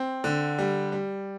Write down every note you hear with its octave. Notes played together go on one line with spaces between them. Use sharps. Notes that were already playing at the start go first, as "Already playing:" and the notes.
Already playing: C4
D3
G3
G3